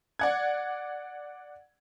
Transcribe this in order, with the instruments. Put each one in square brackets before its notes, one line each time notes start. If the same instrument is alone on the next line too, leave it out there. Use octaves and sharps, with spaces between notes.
[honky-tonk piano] D5 F#5 G#6